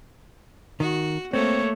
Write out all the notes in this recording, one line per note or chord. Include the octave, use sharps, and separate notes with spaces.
D#3 F#4
A3 A#3 C4 C#5